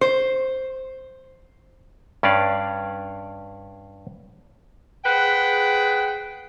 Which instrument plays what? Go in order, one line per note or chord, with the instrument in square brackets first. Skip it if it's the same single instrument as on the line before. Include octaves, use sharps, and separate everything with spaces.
[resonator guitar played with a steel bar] C5
[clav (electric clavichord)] G2 C#4 D4 D5 F5
[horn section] G#4 B4 C5 F#5 G5